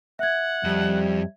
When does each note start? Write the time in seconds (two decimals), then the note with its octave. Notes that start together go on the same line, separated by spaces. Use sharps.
0.19 E5 F#5 G#6
0.64 F2 G3